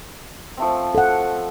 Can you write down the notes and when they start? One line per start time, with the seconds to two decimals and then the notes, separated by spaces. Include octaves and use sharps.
0.57 F3 A3 C4
0.95 A4 F#5